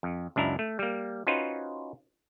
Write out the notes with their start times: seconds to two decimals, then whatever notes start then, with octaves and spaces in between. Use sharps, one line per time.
0.03 F2
0.36 C#2 F#2 D4 E4 A#5
0.59 A3
0.79 G3 A#3
1.27 C#4 D#4 F4 F#4 B4 C5